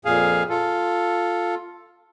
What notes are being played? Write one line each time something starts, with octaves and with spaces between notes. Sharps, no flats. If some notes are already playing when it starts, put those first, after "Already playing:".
F2 A#2 G#4 F5
F4 A4